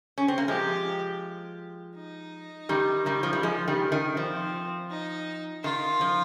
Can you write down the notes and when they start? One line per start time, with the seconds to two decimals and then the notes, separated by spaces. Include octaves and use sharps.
0.18 C#4
0.28 C4
0.38 A#3
0.48 F3 G#3 G4
1.96 D#4
2.69 D#3 G3
3.06 D#3 G3
3.23 F3
3.33 G3
3.43 F3 G#3
3.68 D#3 G3
3.92 D#3
4.17 F3 C4
4.90 D#4
5.64 D#3 F4
6.01 F3